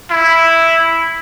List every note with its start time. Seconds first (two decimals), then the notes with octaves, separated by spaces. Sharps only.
0.11 E4